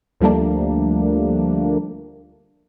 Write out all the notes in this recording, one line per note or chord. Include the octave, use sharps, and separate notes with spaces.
D2 F3 G3 A3 A#3 D4